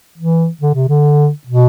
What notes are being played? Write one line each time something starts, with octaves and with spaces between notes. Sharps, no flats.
E3
D3
C3
D3
B2